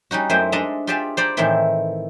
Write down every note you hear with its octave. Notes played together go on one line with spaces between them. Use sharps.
G3 C#4 D#4 F#4
F#2 A3 E4 C5 G5 G#5
G#3 D4 D#5 E5 A5 A#5
F4 G4 G#4 D5 E5 A5
C5 D5 A#5 B5
A2 D#3 E3 A3 C4 E4